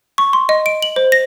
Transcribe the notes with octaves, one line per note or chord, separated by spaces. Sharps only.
C#6
C6
D#5
D7
F#7
C5
A#6